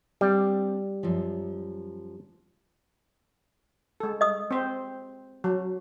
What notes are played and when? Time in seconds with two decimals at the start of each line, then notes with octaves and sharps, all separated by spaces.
0.21 G3 C4 D4
1.03 F#2 F3
4.00 G#3 A4
4.21 D#5 D#6
4.51 C4 C5
5.44 F#3